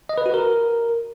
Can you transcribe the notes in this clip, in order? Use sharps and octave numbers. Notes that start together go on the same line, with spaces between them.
D#5
B4
F#4
A#4